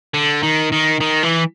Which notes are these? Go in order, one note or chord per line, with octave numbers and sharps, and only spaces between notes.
D3
D#3
D#3
D#3
E3